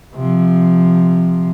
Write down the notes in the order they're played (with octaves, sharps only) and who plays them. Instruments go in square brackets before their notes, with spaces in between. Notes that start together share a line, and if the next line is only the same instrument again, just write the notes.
[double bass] C3 F3